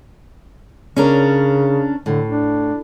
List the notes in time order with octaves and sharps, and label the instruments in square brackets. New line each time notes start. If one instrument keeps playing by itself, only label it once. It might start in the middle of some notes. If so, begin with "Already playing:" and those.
[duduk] C#3 [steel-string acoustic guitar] C#4 D4 A#4
[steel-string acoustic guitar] A2 [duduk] D3
[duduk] D4